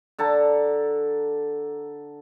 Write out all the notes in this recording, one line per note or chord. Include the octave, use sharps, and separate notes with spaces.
D3 A4 A5 A#5